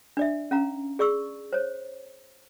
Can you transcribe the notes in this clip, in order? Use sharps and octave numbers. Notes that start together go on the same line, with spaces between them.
D4 D5 E5
C#4 F5 A#5
G#4 D5 C#6 E6
C5 C#5